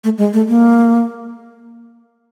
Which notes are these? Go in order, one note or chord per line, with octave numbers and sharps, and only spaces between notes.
A3
G#3
A3
A#3